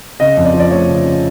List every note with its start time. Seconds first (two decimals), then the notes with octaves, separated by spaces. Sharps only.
0.20 C#3 D#5
0.37 F2
0.45 D5
0.54 F3
0.60 D5
0.71 A3 C#5
0.88 C#3
1.04 C#3